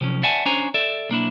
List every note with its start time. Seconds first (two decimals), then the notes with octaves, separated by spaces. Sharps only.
0.01 C3 F3 F#3 C#4
0.23 D5 E5 F#5 G#5 A5
0.46 C#4 D4 C5 C#5 G#5 A#5
0.74 A4 D5 E5
1.09 B1 A#3 D4 E4